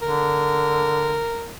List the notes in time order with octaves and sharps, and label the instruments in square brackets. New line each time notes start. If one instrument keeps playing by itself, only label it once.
[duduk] D3 [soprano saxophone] A#4